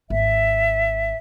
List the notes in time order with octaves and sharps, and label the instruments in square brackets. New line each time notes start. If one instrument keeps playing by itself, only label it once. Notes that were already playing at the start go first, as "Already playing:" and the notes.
[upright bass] G#1 [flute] E5